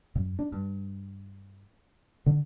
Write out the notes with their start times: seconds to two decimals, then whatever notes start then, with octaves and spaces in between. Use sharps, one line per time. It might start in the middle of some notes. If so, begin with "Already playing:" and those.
0.15 F#2
0.39 D4
0.52 G2
2.26 D3